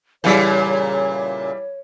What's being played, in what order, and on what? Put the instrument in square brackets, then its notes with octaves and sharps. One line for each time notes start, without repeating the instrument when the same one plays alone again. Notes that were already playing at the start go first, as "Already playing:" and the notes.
[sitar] A#2 C#3 [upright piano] E3 G3 [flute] C#5